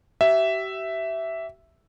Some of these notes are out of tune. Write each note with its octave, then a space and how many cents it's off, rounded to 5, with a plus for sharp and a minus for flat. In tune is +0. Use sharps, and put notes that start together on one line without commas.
G4 -40 E5 +0